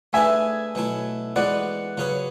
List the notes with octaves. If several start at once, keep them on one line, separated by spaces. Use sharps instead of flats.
A3 D4 G#4 B4 E5 G#5
B2 F#3 A3 E4
E3 G#3 B3 F#4 B4 D5 F#5
C#3 F#3 C#4 G#4 B4